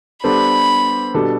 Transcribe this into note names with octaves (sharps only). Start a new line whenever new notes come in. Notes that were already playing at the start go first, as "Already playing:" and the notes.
G3 B3 D4 A4 C5 B5
B2 G3 D4 A4